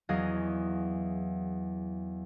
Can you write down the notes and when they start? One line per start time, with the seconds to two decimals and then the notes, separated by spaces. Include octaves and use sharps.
0.09 E2 F#3 G#4 D#5 F5